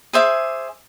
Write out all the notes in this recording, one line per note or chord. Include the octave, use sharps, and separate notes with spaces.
G#4 C5 E5 D6